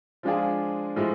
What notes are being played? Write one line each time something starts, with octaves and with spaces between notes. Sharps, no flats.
F3 G#3 D4 F4 G#4
A2 F3 G#3